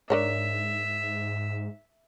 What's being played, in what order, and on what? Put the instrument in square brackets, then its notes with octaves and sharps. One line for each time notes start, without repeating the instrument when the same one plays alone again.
[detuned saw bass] G#2 [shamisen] D4 A#4 C#5 [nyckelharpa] E5